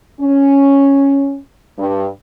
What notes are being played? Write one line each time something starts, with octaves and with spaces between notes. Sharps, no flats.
C#4
G2